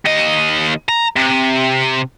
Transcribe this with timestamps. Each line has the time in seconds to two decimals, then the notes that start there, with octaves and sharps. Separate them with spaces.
0.06 D#2 D#5
0.89 A#5
1.16 C3